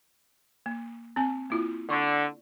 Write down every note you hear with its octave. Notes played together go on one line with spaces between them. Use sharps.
A#3
C4 G#5
A#3 E4 F4
D3 D5 C#6